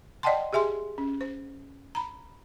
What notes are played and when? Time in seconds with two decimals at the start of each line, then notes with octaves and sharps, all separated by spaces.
0.23 D5 D#5 F#5 G5 A5 C6
0.53 G4 G#4 E5 G#5 C6
0.98 C#4
1.21 C5
1.95 A#5 B5